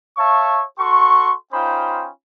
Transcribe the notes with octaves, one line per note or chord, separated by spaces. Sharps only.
C#5 E5 F5 A5 C#6
F#4 A4 C6 C#6
C#4 D#4 F4 C5 G5 B5